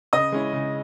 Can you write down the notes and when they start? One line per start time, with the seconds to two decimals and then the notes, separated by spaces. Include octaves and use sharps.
0.13 C#3 D#5 D#6
0.32 G#3 C#4 E4
0.53 C#3